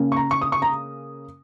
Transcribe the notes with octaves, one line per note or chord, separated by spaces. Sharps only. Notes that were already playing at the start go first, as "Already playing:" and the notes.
Already playing: C#3 A#3 C#4
C#6
A#5
C#6
D#6
C#6
A#5